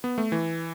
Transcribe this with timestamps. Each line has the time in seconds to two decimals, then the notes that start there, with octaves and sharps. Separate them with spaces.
0.04 B3
0.18 A3
0.32 E3